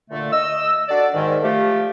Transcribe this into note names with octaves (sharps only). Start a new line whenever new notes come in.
A#2 D3 A3
D#5 E6
D4 F#4 A4 D5
G#2 D#3
F3 A3 G4